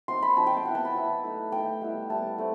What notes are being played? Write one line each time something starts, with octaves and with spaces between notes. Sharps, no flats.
F#3 C4 D#4 C6
B5
F#3 C4 D#4 A5
G5
G5
F#3 B3 E4 F#5
A5
B5
F#3 B3 E4
A3 D#4
A3 D#4 G5
G3 B3 E4
G3 B3 E4 A5
A3 C4